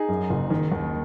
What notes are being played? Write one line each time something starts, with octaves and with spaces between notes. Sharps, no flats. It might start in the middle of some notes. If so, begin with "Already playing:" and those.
Already playing: D#4 G#4
F#2
F#1
D#3
D#2